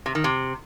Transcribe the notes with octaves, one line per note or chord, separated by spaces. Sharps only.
C3
D#3
C3